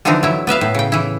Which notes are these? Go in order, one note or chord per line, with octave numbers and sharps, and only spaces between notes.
D3 E3 F3 C4 D4 D#4
F#3 E4
B3 B4 E5 F5
A2
C#3 G5
E3 E4